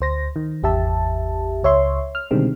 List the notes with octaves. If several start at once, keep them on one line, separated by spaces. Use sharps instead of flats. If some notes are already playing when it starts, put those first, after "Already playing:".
D2 C5 A#6
D#3
G#1 E2 G4 E5 A5
C#2 C#5 E5 C6
F6
B2 D3 D#3 G3 G#3 C4